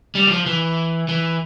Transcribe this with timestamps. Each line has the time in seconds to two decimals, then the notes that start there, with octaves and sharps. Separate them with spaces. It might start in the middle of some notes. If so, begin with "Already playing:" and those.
0.15 G3
0.27 E3
0.30 F3
0.46 E3
1.09 E3